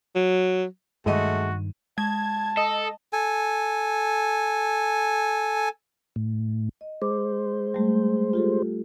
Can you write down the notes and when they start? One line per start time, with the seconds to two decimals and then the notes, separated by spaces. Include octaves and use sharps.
0.15 F#3
1.06 G2 D#3 G#3 A3 F#4 D#5 D#7
1.98 G#3 A5 G#6
2.57 A4 D#5
3.13 A4 G#5
6.16 A2
6.81 D#5
7.02 G#3 C5 D6
7.74 G3 A3
8.33 F4 G4 A4